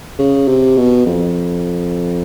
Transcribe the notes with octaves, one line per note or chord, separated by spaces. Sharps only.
C#3
C3
B2
F2